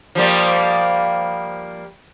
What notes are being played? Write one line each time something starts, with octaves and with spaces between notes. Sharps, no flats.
F3 G3 A#3